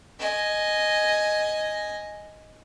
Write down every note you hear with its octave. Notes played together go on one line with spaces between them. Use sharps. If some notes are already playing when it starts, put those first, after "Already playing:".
D#5 G#5